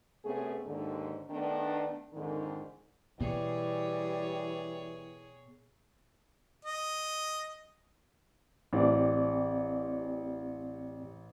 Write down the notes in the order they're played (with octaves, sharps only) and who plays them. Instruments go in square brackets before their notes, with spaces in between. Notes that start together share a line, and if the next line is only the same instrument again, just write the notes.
[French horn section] C3 A3 B3 C#4 G#4
D#2 G#2 D3
D#3 A3 B3 D4
F2 G#2 D3 D#3
[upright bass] B2 [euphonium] E3 [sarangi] G3 [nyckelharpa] G#4 C#5
[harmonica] D#5
[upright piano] A1 [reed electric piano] C4 G4 D5